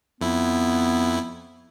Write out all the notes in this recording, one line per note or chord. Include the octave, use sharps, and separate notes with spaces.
F2 B3 E4